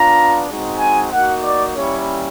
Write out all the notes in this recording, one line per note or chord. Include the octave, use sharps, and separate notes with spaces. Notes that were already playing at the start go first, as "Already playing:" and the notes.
Already playing: B3 D4 F4 A#5
G#3 C4 D#4 F#4
G#5
A#3 D#4 F#4 F#5
D5
G3 A#3 C#4 E4 G4 C#5